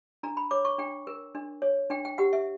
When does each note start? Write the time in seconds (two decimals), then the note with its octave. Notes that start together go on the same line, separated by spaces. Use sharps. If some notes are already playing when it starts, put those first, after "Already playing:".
0.23 D4 A#5
0.37 B5
0.51 C#5 D6
0.65 C#6
0.78 D4 G5
1.07 A#4
1.35 D4
1.62 C#5
1.90 D4 G5
2.05 G5
2.18 G4 F#5
2.33 E5